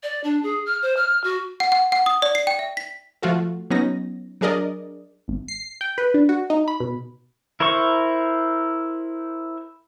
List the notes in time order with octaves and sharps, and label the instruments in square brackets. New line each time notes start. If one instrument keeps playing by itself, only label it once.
[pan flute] D5
D4
G#4
F6
C5
F6
F#4
[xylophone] F#5
F#5
F#5
D#6
D5
C7
G5
E5
B6
[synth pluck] F3 A3 F4 F#4 A4
F#3 B3 C#4 D#4 A#6
F#3 D4 G#4 A#4 D5 D#5
[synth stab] G#1
C7
G5
B4
D4
F#4
D#4
B5
B2
[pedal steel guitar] E4 A#4 C5 C#6